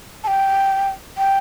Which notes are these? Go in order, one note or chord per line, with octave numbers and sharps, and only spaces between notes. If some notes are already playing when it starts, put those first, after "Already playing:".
A5
G5
G5